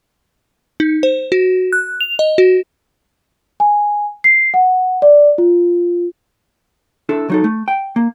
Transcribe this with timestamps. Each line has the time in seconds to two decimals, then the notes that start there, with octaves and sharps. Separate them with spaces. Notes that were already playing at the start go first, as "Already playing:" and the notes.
0.80 D#4
1.03 C5
1.32 F#4
1.73 F#6
2.01 F7
2.19 D#5
2.38 F#4
3.60 G#5
4.24 C7
4.54 F#5
5.02 D5
5.38 F4
7.09 D4 E4 A4
7.30 F#3 D#4 A4
7.44 A3
7.68 G5
7.96 A#3